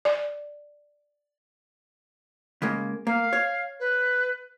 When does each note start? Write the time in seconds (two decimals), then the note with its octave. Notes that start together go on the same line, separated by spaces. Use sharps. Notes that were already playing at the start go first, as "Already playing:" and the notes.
0.05 D5
2.62 C#3 G#3 A#3
3.07 A#3 F5
3.33 C#5
3.80 B4